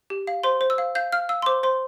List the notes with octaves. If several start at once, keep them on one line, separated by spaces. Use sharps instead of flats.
G4
F5
C5 C6
C5
E6
F5
F5 G6
F5 F6
F5 E6
C6
C5 D6
C5 C6